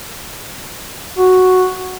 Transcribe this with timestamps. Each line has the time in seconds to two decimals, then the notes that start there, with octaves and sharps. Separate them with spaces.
1.18 F#4